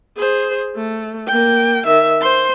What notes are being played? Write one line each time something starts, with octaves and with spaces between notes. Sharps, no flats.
G#4 C5
A3
A#3 G5
D#3 E5
C5 C6